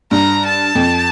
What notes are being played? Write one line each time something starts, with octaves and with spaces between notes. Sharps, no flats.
G2 A#5
A5
F2